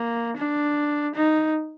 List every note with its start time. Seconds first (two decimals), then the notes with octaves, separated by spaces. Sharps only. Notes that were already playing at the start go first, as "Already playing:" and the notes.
Already playing: A#3
0.37 D4
1.15 D#4